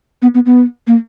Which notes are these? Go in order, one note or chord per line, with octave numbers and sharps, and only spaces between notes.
B3
B3
B3
A#3